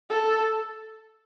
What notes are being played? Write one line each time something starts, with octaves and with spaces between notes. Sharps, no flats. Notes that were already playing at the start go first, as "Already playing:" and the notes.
A4